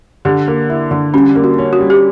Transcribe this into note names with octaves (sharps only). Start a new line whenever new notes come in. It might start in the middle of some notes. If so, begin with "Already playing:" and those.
D3 G4
A#3
E4
D3
G3 C#4
A#3
F#4
C#4
F#4
G3
G4